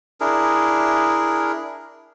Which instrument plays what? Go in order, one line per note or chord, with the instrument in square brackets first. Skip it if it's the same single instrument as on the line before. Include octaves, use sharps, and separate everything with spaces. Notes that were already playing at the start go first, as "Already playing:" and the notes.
[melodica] D4 E4 G#4 A#4